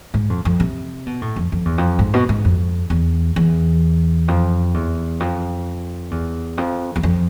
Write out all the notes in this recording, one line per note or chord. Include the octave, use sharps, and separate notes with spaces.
G#2
F2
F2
C3
B2
A2
F2
F2
E2
F2
G#2
B2
G#2
F2
E2
E2
F2
E2
F2
E2
F2
E2
F2